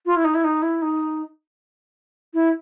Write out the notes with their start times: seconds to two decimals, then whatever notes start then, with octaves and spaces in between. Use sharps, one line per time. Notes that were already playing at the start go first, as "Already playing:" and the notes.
0.05 F4
0.16 E4
0.24 D#4
0.34 E4
0.44 D#4
0.62 E4
0.82 D#4
2.34 E4